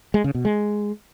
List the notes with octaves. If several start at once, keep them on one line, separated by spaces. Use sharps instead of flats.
G#3
C#3
B2
G#3